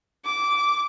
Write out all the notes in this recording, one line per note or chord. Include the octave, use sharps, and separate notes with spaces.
D6